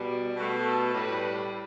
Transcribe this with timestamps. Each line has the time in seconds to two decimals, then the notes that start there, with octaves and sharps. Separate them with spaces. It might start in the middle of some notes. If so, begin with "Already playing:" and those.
Already playing: B2 G3
0.35 B2 A3 F#4
0.64 A4
0.93 A2 G3 B4